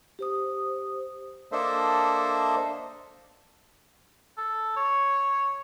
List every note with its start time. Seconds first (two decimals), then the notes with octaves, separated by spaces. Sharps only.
0.19 G4 C5 D#6
1.52 A#3 D4 A4 C5 D#5 E5
4.38 A4
4.76 C#5